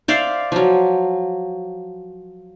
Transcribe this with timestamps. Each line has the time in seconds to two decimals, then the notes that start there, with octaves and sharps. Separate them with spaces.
0.08 C5 D5 E5 F5
0.52 F3 F#3